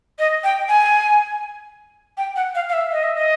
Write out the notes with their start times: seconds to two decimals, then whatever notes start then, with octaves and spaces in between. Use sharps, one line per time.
0.19 D#5
0.44 G5
0.69 G#5
2.17 G5
2.36 F#5
2.55 F5
2.69 F5
2.73 E5
2.92 D#5
3.03 E5
3.16 D#5